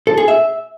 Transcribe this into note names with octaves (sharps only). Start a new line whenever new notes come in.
A4
G#4
E5